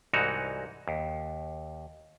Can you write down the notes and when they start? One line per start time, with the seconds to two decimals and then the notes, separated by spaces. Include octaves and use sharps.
0.13 C2 G#2 E3 D#4 F#4 A#5
0.88 D#2